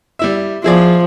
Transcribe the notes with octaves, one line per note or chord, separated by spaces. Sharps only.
G3 E4 E5
F3 E4 G#4 D5